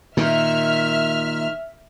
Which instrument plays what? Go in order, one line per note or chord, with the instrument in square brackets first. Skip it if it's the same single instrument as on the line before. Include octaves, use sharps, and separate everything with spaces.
[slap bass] A#2 D#3 [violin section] E5 F6